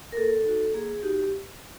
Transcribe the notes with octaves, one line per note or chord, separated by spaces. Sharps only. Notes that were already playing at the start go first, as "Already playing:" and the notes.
A#4
A#3 A4
D#4 F#4
A#3 G#4
D#4 F#4 G4